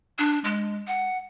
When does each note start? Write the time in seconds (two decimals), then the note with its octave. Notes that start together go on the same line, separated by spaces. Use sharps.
0.19 D4
0.44 G#3
0.87 F#5